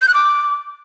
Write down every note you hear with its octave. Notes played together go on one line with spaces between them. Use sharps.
G6
F#6
D6